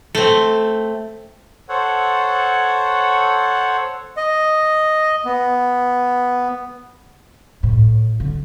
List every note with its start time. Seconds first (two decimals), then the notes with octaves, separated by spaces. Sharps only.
0.15 A3 C4
1.69 A4 C5 C#5 F#5
4.17 D#5
5.25 B3
7.63 A2
8.20 D3